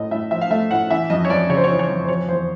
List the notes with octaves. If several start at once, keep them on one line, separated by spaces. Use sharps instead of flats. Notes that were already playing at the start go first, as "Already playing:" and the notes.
Already playing: A2 A3 D#5
A2 E5
F3 E5
F5
A3 E5
A2 F#5
E3 E5
F2 D#5
C#5
F2 D5
C#3 C#5
C5
C#5
E3
C#5
F2
C5
F3 C#5
E2 C5